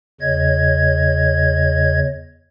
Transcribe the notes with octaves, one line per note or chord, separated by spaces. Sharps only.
E2 C#3 C#5 D#5 G#6